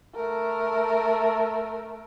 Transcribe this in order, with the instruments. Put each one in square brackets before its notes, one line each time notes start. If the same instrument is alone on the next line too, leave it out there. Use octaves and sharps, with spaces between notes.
[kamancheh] A3 A#4